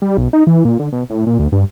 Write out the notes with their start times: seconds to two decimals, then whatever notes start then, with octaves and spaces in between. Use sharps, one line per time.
0.02 G3
0.17 B1
0.33 D#4
0.47 E3
0.65 A#2
0.79 D3
0.93 B2
1.10 A2
1.27 A#2
1.39 D2
1.52 G2